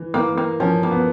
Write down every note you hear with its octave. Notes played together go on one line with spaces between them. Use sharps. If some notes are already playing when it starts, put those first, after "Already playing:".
Already playing: E3
E3 A#3
A#3
F3 C#4
A#3
B3